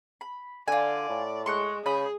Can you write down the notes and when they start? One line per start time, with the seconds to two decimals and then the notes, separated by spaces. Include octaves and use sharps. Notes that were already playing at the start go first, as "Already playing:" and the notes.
0.21 B5
0.68 D3 F4 D5 G#5
1.10 A2
1.46 G#3 C6 C#6 F#6
1.86 C#3 G#4 B5 D#6 G6